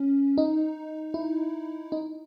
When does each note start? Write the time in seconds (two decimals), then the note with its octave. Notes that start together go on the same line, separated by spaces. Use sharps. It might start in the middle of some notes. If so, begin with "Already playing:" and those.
Already playing: C#4
0.38 D#4
1.14 E4
1.92 D#4